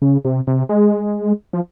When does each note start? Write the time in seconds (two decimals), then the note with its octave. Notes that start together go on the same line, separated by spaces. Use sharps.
0.02 C#3
0.25 C3
0.47 C3
0.69 G#3
1.53 F3